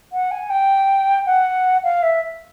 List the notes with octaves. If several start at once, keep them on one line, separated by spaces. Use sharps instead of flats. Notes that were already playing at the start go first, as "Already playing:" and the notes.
F#5
G#5
G5
F#5
F5
E5